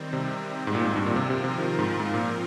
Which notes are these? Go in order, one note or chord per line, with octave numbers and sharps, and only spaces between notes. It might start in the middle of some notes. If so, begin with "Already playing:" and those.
Already playing: D#3 G3 C4
C3
G#2
A#2
G#2
G2
A#2
C3 F3 C4 F4 A#4
C3
C3
D#3
G#2
G#2
A#2